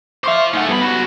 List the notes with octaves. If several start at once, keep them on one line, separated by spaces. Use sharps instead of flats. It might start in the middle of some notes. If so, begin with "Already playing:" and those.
C5 E5 F5 C#6 D6
A3 D#4 G#4 F#5
F2 G3 B3 B5
C#3 F#4